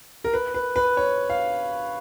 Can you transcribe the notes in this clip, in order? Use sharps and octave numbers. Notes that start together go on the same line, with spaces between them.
A#4
B4
B4
B4
C#5
F5